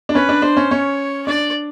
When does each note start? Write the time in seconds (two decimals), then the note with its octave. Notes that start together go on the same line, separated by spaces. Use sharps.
0.09 D4
0.14 C#4 B4
0.29 D4
0.42 D4 C5
0.57 C#4
0.71 C#4 C#5
1.27 D4 D5